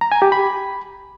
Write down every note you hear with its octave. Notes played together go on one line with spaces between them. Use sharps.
A#5
G#5
G4
B5